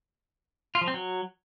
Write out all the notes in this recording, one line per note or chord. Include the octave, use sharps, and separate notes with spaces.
F4
F3
C4
F#3